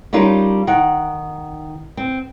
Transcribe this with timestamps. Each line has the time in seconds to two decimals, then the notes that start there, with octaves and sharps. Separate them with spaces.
0.13 G3 C#4 D#4 F4 A#4
0.67 D#3 F#5
1.97 C4